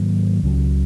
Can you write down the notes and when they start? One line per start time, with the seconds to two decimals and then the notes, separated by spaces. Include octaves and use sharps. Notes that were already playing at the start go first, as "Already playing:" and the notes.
Already playing: G#2 D#3 F#3 A#3
0.43 C#2 C#3 F#3